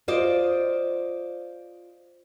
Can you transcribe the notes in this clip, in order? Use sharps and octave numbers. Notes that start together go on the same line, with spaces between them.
F4 C5 D5 D#5